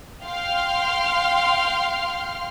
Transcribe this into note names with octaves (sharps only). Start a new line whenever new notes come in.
F5 G5 C6 F6